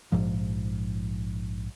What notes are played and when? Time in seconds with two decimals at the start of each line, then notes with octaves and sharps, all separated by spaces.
0.12 A#1 G#2 F3